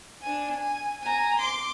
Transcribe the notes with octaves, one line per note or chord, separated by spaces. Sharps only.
D4 G#5
G#5
G#5 A#5
C6 D6